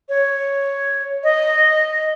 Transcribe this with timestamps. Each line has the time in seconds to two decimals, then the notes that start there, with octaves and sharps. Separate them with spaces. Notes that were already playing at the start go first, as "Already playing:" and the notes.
0.09 C#5
1.24 D#5